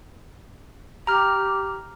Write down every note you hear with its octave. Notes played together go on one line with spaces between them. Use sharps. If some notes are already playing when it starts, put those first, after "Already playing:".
G4 A#5 F6